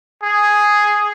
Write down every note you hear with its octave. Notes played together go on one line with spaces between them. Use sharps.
G#4